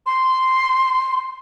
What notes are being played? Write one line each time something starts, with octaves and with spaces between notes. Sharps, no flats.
C6